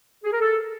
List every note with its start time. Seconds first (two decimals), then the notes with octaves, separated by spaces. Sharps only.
0.24 G#4
0.32 A#4
0.41 A4